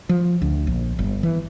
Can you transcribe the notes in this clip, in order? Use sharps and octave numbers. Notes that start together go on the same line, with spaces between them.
F3
D2
A#1
G1
E3